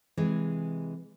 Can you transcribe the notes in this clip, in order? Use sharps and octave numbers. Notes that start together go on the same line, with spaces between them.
C3 E3 G#3